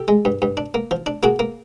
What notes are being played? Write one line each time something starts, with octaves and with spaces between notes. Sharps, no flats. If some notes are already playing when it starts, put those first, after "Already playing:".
Already playing: G4 A4
G#3
G2
G2
D4
A#3
F3
D4
A#3 F#4 G#4
A#3